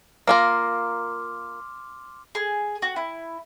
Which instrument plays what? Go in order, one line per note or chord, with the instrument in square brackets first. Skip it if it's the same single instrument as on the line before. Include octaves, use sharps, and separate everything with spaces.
[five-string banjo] A#3 F4 A#4 [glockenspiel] C6 D6 F6
[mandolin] G#4
F#4
E4